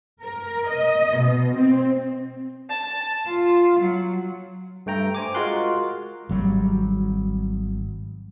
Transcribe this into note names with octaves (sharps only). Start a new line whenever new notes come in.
A#4
D#5
B2
C4
A5
F4
F#3
G2 A3 G5 A#5
C5 G#5 D6
G#3 F4 F#4 A#4 C6 F#6
G#1 F#3 G3